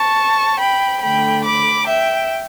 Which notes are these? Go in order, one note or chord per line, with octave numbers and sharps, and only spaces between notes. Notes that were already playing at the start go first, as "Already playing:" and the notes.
Already playing: A5 C#6
G5 B5
D3 A3 G5 B5
B5 D6
E5 G5